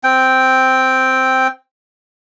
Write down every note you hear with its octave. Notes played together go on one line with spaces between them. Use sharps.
C4 G5